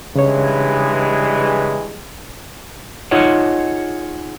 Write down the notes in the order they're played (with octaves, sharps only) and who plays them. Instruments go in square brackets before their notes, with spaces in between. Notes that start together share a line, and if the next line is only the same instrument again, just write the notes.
[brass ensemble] G2 E3 G#3 [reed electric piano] C#3 C#5
[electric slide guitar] D#4 F4 G#4 C#5 D#5 F#5